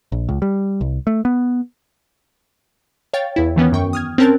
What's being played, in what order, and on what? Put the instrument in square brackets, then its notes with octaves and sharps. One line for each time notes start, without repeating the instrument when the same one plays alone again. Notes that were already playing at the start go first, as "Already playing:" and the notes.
[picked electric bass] A#1
C#2
G3
C2
A3
B3
[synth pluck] C#5 F5 G5 A6
E2 E4
D#3 E3 B3 C#4
F#2 G5 C#6
D#6 F6 G#6
C4 C#4 A#4 A5 F#6 A6